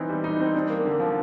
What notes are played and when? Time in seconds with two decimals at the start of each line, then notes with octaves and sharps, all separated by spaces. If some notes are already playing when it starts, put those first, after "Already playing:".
Already playing: E3 C4 D#4
0.09 G3
0.24 D#4
0.40 C4
0.55 D4
0.70 A#3
0.85 D3
1.00 F3